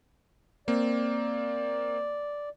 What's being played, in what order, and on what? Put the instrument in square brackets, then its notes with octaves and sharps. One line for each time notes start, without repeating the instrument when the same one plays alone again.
[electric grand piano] A#3 C4 [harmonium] D5